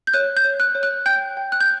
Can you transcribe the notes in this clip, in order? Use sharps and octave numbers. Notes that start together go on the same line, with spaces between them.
G6
C#5 F#6
G6
C#5
F#6
C#5
F#6
G5 G6
G5
F#6
G6